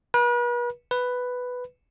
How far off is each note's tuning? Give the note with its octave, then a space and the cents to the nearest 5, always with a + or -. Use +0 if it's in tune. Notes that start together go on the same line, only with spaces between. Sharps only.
B4 -40
B4 +5